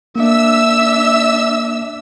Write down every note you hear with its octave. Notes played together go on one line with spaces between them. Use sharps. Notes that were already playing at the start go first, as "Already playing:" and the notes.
A#3 D4 E5 E6